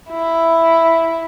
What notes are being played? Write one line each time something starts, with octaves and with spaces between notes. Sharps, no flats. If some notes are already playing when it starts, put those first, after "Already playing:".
E4